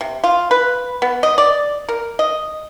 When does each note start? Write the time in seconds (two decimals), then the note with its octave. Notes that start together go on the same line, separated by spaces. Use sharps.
0.01 C3
0.24 F4
0.51 B4
1.02 B3
1.23 D#5
1.38 D5
1.89 A#4
2.19 D#5